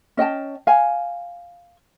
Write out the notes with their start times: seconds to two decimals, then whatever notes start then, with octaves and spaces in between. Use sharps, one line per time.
0.17 C#4 D#5 G5 A5
0.67 F5 G#5